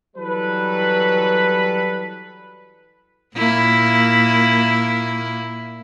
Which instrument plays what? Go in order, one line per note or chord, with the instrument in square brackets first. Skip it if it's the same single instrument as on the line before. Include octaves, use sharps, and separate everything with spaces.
[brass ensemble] E3 F#3 G3 A4 B4
[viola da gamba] A#2 A#3 E4